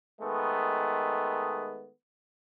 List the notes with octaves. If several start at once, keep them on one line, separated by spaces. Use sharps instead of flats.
D#3 G#3 A3 B3